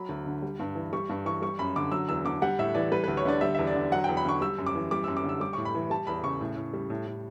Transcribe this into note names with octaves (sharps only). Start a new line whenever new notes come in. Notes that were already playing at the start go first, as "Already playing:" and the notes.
Already playing: F#3 B5
D2
D3
G3
G2
E3
G3 C#6
G2
E3 C#6
G3 C#6
F#2 B5
D3 D6
F#3 E6
E2 E6
D3 D6
G3 F#5
A2 E5
E3 D5
G3 B4
B4
D2
C#5
D3 D5
G3 E5
E5
E2
D5
D3
F#3 F#5
G5
E2
B5
D3 C#6
G3 E6
F#2
D6
E3
G3 D6
E6
F#2
D6
D3
E6
G3 D6
C#6
A2
B5
E3
G3 A5
E2 B5
C#3 C#6
A2
A2
G3
A2
A2